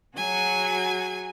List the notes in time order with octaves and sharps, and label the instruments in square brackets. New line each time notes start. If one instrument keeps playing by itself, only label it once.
[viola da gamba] F#3 F#4 G#4 [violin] G#5